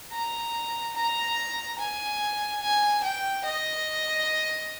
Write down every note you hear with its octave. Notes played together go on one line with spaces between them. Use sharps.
A#5
A#5
G#5
G#5
G5
D#5